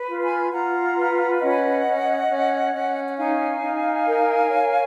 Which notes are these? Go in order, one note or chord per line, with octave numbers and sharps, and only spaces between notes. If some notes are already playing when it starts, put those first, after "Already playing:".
Already playing: B4
F4
G#5 B5
F4 F#5 A#5
B4
C#4 D#5 F#5
C#4
C#4
C#4
F#5
D#4 F5 G#5
D#4
A#4
C#5